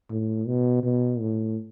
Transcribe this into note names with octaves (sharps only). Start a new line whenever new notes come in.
A2
B2
B2
A2